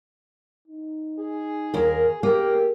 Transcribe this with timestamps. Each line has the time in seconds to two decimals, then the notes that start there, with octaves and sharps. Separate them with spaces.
0.68 D#4
1.19 G#4
1.74 D#2 A#4
2.23 A#3 G4 G#4